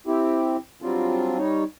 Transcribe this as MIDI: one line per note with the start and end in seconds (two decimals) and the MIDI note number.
0.07 0.57 60
0.07 0.57 64
0.07 0.57 67
0.82 1.38 54
0.82 1.38 55
0.82 1.38 60
0.82 1.38 62
0.82 1.38 65
1.38 1.64 55
1.38 1.64 63
1.38 1.64 73